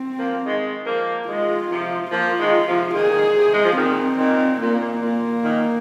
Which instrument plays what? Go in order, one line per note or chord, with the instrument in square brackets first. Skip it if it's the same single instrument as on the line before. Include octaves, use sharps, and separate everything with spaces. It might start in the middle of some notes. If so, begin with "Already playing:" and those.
Already playing: [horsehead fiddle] C4
[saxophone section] F3 A#3
D#3 G#3
F3 A#3
[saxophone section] D#3 G#3 [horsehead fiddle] F4
[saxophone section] C3 F3
[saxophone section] F3 A#3 [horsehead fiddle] F4
[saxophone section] D#3 G#3
C3 F3
[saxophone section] A#2 D#3 [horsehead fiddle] G#4
[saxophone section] C3
G#3
F3
[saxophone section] A#2 D#3 [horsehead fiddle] C4
[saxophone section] A#2 D#3
[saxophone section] A#2 [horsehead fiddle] A#3
[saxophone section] A#2
A#2 D#3